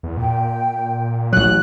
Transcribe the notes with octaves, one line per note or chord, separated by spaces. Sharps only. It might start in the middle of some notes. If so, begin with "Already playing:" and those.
E2
A#2 G5
A1 F#3 F#6